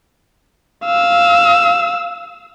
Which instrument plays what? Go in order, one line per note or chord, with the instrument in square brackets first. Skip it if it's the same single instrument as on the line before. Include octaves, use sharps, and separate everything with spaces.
[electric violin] F5 E6